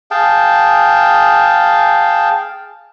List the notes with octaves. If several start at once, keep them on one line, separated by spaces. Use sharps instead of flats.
G#4 F5 G5 A5